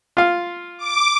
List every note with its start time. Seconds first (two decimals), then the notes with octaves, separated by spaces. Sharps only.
0.17 F4 F5
0.78 D6